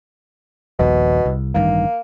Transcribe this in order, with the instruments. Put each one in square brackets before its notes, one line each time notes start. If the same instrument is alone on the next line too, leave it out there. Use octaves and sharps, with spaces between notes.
[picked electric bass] D#1 A#1 D#2 [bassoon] B2
[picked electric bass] C2
[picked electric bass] A1 G2 D#3 [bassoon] A#3